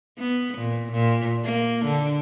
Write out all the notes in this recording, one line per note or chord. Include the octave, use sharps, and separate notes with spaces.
B3
A#2
A#2
A#3
D3